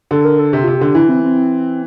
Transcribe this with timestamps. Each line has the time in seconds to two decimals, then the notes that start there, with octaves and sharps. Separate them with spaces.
0.11 D3 A4
0.25 A#4
0.39 A4
0.53 C3 G4
0.64 C3 F4
0.75 G4
0.81 D3
0.95 E3 E4
1.09 C4
1.24 C4